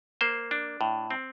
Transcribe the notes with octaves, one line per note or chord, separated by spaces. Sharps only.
A#3 C5
D4
A2
C4